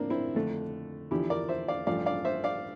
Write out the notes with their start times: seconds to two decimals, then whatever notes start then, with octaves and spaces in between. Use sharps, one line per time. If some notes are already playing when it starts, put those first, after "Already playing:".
Already playing: A2 F3 A#3 C4 D4
0.10 C4 E4
0.34 F2 D3 A3
1.11 E2 D3 F3 E4 G4
1.30 A#4 D5
1.49 C5 E5
1.68 D5 F5
1.87 A1 G2 F3 A3 D5 F5
2.06 D5 F5
2.25 C5 E5
2.44 D5 F5